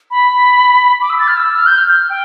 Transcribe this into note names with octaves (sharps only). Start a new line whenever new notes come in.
B5
D6
E6
A6
F6
E6
F6
G6
F6
G5